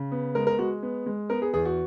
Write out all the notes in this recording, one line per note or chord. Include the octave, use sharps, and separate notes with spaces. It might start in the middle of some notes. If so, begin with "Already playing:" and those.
Already playing: C#3
B3
G#3 A#4
A#4
G#3 F#4
B3
G#3
B3 A#4
G#4
E2 G#4
F#4